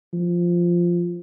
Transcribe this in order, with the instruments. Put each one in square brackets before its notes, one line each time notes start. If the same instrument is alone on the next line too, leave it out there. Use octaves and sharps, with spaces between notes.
[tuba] F3